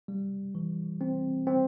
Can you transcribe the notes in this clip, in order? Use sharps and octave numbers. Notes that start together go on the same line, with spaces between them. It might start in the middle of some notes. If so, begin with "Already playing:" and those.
G3
E3
C4
C4